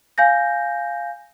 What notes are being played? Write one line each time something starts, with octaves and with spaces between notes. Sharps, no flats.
F5 G#5 G6 A#6